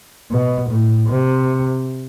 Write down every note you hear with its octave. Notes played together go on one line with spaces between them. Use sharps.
B2
A2
C3